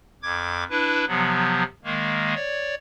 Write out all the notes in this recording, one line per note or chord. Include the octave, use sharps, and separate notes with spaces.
F2 D6 G#6
D4 E4 B4
C3 F3 F#3 B3
D#3 G#3 A#3
C#5 D5